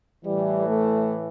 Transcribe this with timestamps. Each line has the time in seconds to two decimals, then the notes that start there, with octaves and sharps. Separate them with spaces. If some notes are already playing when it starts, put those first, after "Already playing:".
0.24 E3 G3
0.29 A2
0.67 A3